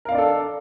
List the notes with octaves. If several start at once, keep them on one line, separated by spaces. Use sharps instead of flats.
D4 A4 A#4 D5 F5